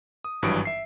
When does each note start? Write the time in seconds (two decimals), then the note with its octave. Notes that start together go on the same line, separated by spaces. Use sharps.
0.24 D#6
0.42 G#1 G2 E3 F#3 D#6 D7
0.65 E5 C7